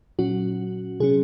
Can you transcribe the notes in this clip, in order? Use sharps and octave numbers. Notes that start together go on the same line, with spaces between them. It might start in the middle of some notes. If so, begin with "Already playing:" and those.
A#2 F#3 C#4 F#4
C3 F#3 C#4 G#4